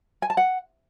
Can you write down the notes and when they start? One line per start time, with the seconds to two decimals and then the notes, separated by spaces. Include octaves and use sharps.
0.22 G#5
0.30 A5
0.37 F#5